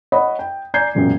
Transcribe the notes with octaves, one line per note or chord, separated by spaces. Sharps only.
C#5 D#5 F#5 B5
G5
D5 G#5 A#5 G6 G#6 C7
E1 F#2 A#2